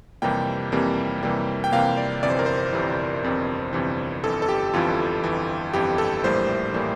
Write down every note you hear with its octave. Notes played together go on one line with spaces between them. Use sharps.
F2 C3 E3 G3 A#3 G5
F2 C3 E3 G3 A#3
F2 C3 E3 G3 A#3
G5
F2 C3 E3 G3 A#3 F5
D5
G1 F2 C3 E3 D5
C5
A#4
C5
G1 F2 C3 E3
G1 F2 C3 E3
G1 F2 C3 E3
G1 F2 E3 A4
A4
G4
G1 F2 E3 F4
G1 F2 E3
G1 F2 E3 G4
A4
A#1 A2 E3 G3 A#3 C5
A2 E3 G3 A#3